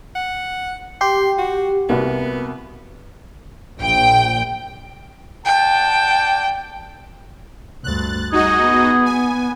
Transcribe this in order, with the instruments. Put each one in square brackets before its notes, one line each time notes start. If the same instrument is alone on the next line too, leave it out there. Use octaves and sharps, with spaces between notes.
[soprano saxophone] F#5
[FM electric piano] G4 [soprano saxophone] C6
[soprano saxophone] F#4
[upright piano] C2 A#3 F#4 [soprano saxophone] B3
[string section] A#1 G5
[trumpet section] D5 F#5 A5 [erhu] G5
[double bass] D2 G2 [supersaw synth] F#6 A6
[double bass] G3 [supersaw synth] D#4 F#4 D#5 [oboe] G#4
[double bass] B3
[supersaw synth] G#5